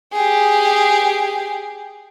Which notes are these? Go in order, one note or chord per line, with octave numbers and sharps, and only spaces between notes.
G4 G#4